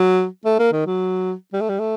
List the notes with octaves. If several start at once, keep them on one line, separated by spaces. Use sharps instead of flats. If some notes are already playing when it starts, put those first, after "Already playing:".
Already playing: F#3
A3
A#3
D#3
F#3
G3
A3
G3
A3